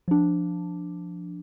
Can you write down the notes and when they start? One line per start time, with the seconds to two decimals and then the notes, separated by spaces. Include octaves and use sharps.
0.08 F3 D4